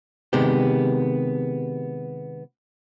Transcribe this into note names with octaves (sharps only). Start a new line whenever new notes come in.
C3 D#3 G#3 B3 G4